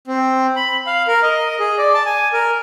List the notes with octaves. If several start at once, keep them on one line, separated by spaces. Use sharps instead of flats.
C4
B5
F5
A#4
D#5
G#4
D5
A5
G#5
A#4